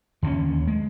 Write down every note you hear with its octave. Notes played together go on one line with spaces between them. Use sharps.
D#2 D3 D#3 C#4
G#3